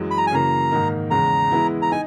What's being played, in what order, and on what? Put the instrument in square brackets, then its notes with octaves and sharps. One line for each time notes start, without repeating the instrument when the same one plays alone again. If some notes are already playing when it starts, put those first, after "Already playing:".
Already playing: [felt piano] F#2 E3 G#3
[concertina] B5
A#5
G#5
[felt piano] F#2 C#3 E3 A#3 [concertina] A#5
[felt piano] G#2 D#3 A#3 D#4 A#4
[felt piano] E2 C#3 G#3 [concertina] A#5
[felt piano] E3 G#3 B3 E4
[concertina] A#5
[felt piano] D#4 [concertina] G#5